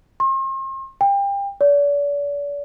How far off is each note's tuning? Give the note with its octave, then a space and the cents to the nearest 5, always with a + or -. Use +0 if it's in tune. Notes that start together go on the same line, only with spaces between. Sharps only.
C6 +45
G5 +30
D5 -40